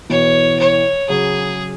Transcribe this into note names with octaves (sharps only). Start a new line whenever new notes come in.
B2 E3 C#5
C#5
C#3 F#3 G#4